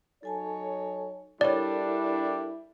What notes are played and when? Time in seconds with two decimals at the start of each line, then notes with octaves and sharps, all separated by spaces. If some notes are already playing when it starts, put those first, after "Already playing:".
0.23 F#3 D#4 A4 C#5 G#5 A5
1.41 G3 D4 E4 A4 A#4 C#5 D5